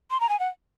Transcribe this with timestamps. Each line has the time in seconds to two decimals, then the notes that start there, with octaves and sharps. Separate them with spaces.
0.11 C6
0.20 A#5
0.29 G#5
0.40 F#5